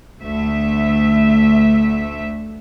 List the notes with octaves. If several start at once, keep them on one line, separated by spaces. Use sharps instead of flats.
D2 A3 E5